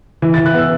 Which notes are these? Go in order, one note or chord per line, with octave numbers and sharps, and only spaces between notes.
E3
E3 A6
F#6
B3 E6